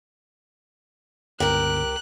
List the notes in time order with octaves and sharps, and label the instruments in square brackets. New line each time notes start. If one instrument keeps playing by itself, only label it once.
[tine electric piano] G1 [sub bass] C#2 [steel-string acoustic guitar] G4 A#4 [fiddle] F#6